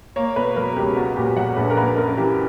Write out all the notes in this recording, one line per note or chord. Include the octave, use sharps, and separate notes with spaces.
A#3 C#5
B2 B4
F#3 A#4
C#2 G4
B3 F#4
A#2 G4
F#3 F#5
A#1 B4
A#4
A#3 B4
F#2 A#4
E3 G4